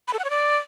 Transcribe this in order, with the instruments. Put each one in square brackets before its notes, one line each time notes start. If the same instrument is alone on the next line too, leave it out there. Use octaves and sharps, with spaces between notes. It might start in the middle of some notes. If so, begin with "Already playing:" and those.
[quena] B5
A4
F#5
C#5
D5